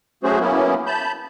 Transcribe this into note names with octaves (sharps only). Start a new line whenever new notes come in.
F#3 A3 C#4 F#4 G#4 C5
F#3 A#3 B3 C#4 E4
A5 B5 G6